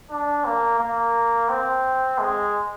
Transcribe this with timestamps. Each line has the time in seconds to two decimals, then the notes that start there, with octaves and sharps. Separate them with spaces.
0.10 D4
0.45 A#3
0.80 A#3
1.49 C4
2.19 G#3